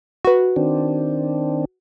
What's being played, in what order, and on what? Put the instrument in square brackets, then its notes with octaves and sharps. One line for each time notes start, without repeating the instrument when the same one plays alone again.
[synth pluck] F#4 B4
[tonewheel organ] D#3 C4 D4